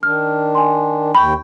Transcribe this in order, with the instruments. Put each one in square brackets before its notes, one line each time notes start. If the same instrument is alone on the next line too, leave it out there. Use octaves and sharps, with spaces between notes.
[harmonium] D#3 D4 [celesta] F6
[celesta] G#5 C6
[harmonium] D#2 G5 [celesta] B5 C#6